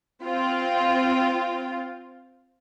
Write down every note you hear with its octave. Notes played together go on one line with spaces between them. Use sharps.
C4 F4